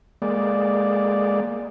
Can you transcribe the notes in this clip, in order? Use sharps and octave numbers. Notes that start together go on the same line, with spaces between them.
G#3 A#3 D5